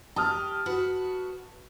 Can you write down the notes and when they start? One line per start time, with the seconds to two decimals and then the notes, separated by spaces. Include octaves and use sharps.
0.16 G4 A5 D#6 F6
0.66 F#4 B4